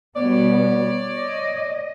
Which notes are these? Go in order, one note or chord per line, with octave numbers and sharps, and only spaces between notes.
B2 G3 B3 C#5 D5
D#5